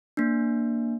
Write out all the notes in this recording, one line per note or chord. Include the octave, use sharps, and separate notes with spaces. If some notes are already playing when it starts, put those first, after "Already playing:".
A#3 D4